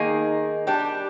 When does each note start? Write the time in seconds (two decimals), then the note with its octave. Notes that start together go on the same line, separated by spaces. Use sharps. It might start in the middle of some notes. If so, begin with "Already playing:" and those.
Already playing: D#3 A#3 D#4 G#4
0.67 G3 D4 G4